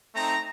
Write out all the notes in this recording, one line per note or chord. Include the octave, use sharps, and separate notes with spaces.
A3 C4 D#4 A#5